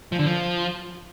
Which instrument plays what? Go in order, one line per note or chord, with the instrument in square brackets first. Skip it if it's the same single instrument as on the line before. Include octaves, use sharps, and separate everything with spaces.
[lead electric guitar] F3
D3
F3